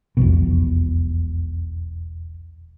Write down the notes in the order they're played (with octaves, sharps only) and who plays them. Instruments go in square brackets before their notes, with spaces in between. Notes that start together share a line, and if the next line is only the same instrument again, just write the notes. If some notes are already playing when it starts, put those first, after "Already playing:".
[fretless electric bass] E1 B1 F2 B2